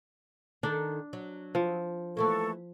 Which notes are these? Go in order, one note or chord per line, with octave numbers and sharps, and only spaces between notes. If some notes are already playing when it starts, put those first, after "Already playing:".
D#3 D4 A4
F#3
F3
E3 A3 A#3 A4 C#6